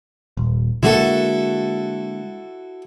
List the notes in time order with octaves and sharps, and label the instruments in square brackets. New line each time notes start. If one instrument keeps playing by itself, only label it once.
[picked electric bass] D#1
[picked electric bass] D3 G#3 A#3 [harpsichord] E4 F#4 A4